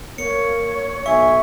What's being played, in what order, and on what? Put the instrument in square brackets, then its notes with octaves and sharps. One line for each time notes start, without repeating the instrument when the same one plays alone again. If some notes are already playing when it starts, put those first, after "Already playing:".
[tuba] A#3 [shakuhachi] C#5 [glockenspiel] C#7
[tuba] B1 [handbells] E5 [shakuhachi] G#5 [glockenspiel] C#6